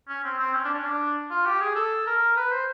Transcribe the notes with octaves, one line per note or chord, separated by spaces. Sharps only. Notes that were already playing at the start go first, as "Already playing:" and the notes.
C#4
C4
C4
C#4
D4
C#4
D4
F4
G4
G#4
A4
A#4
B4
C5